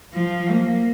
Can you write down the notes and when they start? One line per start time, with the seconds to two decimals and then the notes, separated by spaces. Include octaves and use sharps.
0.13 F3
0.50 A#3